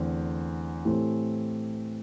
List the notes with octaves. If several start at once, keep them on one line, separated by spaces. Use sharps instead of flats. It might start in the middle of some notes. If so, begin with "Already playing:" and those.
Already playing: E2 D3 A3 C4
A2 E3 A3 C4 G4